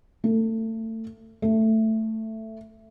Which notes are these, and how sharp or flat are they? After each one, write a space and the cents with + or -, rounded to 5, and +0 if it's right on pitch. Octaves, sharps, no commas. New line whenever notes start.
A3 +30
A3 +10